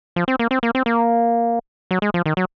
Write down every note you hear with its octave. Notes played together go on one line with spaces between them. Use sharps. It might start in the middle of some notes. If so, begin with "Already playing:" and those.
F3
C4
A#3
C4
A#3
C4
A#3
F#3
G#3
F3
D#3
F#3